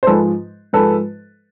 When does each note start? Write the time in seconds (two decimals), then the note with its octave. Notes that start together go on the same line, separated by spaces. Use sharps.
0.03 C5
0.07 G#2 F3 G#3 A4 B4
0.73 G#2 F3 G#3 A4 B4